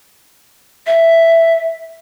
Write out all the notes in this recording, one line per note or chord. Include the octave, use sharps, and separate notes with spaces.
E5